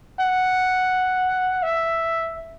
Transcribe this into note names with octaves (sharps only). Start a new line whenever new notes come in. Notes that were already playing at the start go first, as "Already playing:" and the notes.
F#5
E5